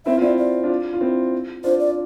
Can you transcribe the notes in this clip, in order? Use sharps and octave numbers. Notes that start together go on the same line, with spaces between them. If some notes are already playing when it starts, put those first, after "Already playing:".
C4 E4 E5
F4
C4 E4 D5
F4 D5
D4 F4
F4
C4 E4
D4 F4 C5
D5